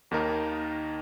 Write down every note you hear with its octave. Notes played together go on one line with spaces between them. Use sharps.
D#2 D#3 A#3 D#4 A#4